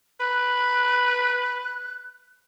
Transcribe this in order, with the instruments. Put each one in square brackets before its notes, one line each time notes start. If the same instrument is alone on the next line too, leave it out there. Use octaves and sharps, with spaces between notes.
[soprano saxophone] B4 [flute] F#6